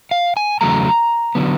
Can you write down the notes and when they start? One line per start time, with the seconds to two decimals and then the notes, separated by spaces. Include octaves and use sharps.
0.11 F5
0.37 G#5
0.61 E2 C#3 F#3 A3 A#5
1.35 D3 F#3 B3